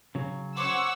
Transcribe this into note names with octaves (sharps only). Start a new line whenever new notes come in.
C#3 F#3
C5 C#5 F#5 C#6 D6 E6